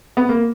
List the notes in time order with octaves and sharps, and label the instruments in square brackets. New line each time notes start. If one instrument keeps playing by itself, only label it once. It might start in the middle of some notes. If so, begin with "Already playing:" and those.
[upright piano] B3
A#3